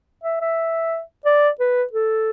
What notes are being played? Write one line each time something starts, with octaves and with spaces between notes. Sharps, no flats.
E5
E5
D5
B4
A4